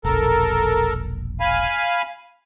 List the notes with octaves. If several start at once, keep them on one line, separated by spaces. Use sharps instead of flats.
E1 A#1 A4 A#4
F5 G#5 B5